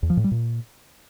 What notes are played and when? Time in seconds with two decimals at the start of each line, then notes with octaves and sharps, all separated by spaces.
0.03 E2
0.10 F3
0.17 A2
0.24 G3
0.31 A#2